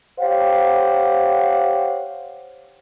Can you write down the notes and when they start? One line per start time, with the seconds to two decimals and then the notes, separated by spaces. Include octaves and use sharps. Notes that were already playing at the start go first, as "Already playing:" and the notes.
0.20 G4 C5 C#5 F5 F#5